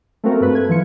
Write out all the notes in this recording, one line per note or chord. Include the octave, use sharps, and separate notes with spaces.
A3 A#3 C4 F#4 A#4
G2 A3 B4
G#6
E3 F3 C#7